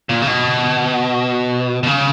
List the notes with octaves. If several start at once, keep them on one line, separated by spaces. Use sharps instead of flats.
A#2
C#3
B2
B2
C#3